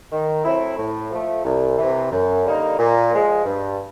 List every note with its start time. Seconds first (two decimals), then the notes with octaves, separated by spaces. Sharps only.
0.11 D#3
0.44 F#3 A3 C4 E4
0.78 A2
1.11 F3 A3
1.45 C2
1.78 C3 E3
2.12 F#2
2.44 D3 G3 A#3 D#4
2.79 A#2
3.12 F3 G#3
3.45 G2